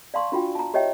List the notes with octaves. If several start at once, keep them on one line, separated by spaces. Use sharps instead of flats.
D5 F5 A5 C6 C#6
D4 F4 F#4 G5
A5 A#5
G4 C#5 D#5 E5 G5